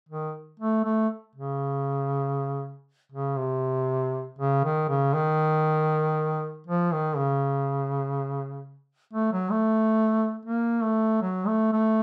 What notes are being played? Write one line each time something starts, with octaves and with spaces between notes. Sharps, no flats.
D#3
A3
A3
C#3
C#3
C3
C#3
D#3
C#3
D#3
F3
D#3
C#3
A3
F#3
A3
A#3
A3
F#3
A3
A3